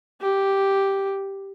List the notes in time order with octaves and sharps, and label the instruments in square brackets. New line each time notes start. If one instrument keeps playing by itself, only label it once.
[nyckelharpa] G4